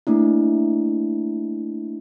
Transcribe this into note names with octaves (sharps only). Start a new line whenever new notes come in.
A3 A#3 D4 E4